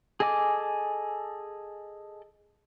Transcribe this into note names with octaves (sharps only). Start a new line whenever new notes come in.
G#4 A4 D#5 G#5 D6